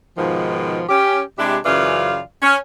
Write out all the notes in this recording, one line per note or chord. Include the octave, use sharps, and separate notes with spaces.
G#2 B2 D#3 F3
C#4 G4
C3 G#3 D4 E4 G4
F#2 C#3 E3 F4 D5 F5
C#4